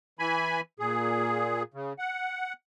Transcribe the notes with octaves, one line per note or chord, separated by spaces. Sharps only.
E3 G#5 B5
A#2 G#4
C#3
F#5